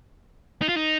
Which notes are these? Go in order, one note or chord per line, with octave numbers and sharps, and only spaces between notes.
D#4
F4
D#4